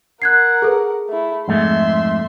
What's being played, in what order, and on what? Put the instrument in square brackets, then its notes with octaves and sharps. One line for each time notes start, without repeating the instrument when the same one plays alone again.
[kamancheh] A#4 F#5 [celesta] F#6 G#6 C7
[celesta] G#4 A4 B4
[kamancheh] A3 E4
[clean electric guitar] F2 G#2 A3 [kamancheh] E5 C6